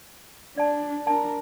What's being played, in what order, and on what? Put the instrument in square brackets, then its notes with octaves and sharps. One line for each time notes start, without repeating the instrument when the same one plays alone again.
[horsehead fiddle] D4 [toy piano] D5 A5
[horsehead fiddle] D4 A#4 [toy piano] A5